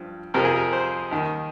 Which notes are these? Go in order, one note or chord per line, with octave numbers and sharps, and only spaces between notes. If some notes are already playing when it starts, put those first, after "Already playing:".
Already playing: G2 F3
F2 C3 F3 A#4
G#4
A#4
C5
D#2 D#3